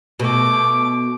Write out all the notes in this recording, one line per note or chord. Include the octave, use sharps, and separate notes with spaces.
B2 A3 D6